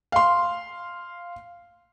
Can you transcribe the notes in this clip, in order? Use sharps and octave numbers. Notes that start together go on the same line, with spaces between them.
F5 C6